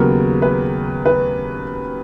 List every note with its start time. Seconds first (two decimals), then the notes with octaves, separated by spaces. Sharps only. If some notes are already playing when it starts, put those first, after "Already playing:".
Already playing: D#2 C#3 F#3 B3 A#4
0.42 B4
1.05 B4